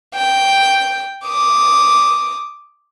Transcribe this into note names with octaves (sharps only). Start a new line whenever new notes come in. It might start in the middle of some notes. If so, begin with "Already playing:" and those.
G5
D6 D#6